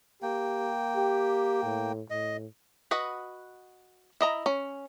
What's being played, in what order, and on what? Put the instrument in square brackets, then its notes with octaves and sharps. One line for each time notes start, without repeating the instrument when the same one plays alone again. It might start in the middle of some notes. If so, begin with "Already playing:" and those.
[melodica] A#3 G5 [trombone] G4
[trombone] G4
A2
[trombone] A2 [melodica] D#5
[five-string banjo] F#4 B4 D#5 F#5
E4 D#5 A#5
C#4